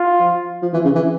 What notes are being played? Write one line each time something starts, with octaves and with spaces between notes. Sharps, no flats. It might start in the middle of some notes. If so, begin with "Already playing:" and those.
Already playing: F4
F3
F3
E3
C#3
E3